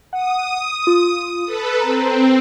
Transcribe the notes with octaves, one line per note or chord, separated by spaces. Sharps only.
F#5 D#6
F4
A4 B4
C4 A#5